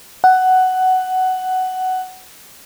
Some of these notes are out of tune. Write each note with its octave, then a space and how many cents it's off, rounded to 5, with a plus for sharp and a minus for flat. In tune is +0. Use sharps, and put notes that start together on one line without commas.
F#5 +10